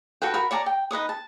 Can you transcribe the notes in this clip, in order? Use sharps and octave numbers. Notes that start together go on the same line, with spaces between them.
F#4 A4 B4 G5
F#4 A#4 B5
C#5 D5 A5 A#5
G5
D#4 B4 C#5 D#6
A5